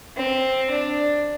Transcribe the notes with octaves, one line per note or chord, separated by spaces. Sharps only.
C4
D4